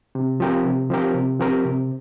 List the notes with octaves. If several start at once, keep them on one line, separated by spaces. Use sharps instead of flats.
C3
F3 C4 G4 A#4
C3
F3 C4 G4 A#4
C3
F3 C4 G4 A#4
C3